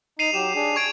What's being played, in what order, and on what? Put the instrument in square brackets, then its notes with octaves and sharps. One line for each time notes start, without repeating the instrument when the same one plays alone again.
[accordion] D#4 [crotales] C7 D#7 F7
[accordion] F#3 G4 [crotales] E7
[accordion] D4 G#4
[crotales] C#6 G#6 D7